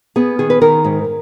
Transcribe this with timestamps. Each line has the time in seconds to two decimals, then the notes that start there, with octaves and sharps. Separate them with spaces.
0.16 B3 G#4
0.39 D#3 G#4
0.50 B4
0.61 D#3 A#4
0.84 G#2